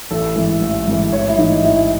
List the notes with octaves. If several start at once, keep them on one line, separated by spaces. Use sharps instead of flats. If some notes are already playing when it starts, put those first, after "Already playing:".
A1 A4
G#2 E3
A1
G#2 E3
A1 C#5
E4
G#2 E3 D#4
A1 E4